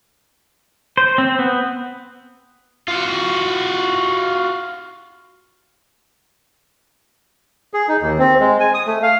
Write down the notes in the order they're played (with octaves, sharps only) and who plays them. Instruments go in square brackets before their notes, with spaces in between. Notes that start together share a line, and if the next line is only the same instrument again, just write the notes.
[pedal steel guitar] C5
C4
B3
[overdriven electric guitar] F4 F#4
[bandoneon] G#4
D#4
D#2
C4
G#3
G#5
D#6
A3
F5